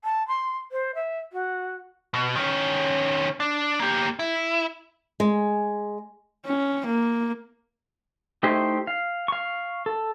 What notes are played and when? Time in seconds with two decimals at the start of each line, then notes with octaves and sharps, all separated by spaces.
0.04 A5
0.28 C6
0.72 C5
0.95 E5
1.32 F#4
2.14 B2
2.36 D#3 C#4
3.40 D4
3.80 A#3 G4
4.19 E4
5.20 G#3
6.46 C#4
6.86 A#3
8.43 A3 D#4 E4 G4 C5
8.87 F5
9.28 F5 C#6
9.86 A4